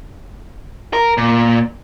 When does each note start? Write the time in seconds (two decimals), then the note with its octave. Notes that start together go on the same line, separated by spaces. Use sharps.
0.93 A#4
1.18 A#2